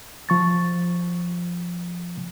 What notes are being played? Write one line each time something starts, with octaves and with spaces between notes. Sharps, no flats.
F3 C#6 A6